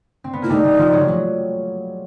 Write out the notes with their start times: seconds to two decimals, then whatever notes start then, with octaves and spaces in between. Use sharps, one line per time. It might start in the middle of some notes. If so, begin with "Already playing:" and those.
0.24 C4
0.33 B3
0.42 A#3 E4
0.50 G3 A3 D#4
0.64 G3 A3
0.79 F3 G3
0.93 F#3
1.01 F3
1.08 F#3